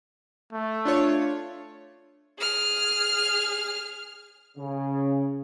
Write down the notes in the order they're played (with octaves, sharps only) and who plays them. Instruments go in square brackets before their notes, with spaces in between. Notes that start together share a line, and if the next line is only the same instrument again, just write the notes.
[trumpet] A3
[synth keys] D4 F4 C#5
[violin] G#4 F6
[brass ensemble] C#3